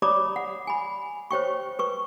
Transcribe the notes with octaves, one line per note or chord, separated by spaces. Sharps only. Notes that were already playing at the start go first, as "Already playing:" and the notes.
C#5 D5 A#5 B5 D6 D#6
F#5
G#5 B5
C5 C#5 G5 C#6
B4 C#6